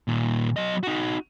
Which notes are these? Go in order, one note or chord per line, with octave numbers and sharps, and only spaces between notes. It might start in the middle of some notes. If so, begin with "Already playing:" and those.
A#2 D#3
F#3 D#5
D#4 F#4